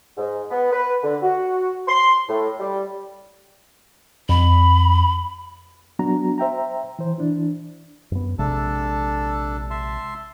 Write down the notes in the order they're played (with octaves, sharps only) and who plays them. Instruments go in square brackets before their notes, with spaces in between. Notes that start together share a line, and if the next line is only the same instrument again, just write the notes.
[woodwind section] G#2
B3
B4
D3
F#4
C6
A2
G3
[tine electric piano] F2 [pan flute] B5
[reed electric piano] F#3 B3 D4 F#4 A#5
C5 E5 G5 A#5
E3 C5
E3 D4 E4
[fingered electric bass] F#2 B3
[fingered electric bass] A#1 C3 G#3 [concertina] D4 A4 A5
[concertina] E5 A5 C6